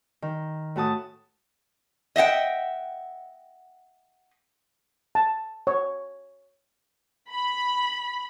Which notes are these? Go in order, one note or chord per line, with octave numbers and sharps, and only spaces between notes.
D#3
A2 F#4 A5 D#6
D#5 E5 F#5 G5
A5
C#5
B5